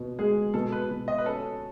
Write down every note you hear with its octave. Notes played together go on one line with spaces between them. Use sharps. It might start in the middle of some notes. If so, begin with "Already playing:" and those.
Already playing: B2
G#3 G#4
B2 A4
B4
B2
D#5
B4
C#4 A4